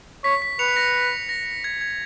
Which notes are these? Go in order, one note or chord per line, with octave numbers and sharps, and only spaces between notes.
C#5 B6
B6
B4 C#7 F7
B6
A#6 C#7
B6
A#6
G#6
G#6